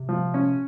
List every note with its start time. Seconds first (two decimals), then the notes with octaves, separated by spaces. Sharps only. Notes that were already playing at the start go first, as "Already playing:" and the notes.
Already playing: C3
0.09 F3
0.34 C#4